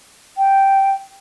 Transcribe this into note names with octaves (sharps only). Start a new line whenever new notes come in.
G5